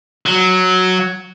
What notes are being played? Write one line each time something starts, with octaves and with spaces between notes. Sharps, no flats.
F#3